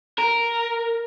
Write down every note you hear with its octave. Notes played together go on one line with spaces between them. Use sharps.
A#4